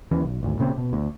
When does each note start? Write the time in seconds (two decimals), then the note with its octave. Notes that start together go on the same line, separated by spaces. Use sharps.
0.11 D#2 E3 C#4
0.24 B1
0.43 G#1 D2
0.59 A#2 C#3 B3 C4
0.78 B2
0.93 D2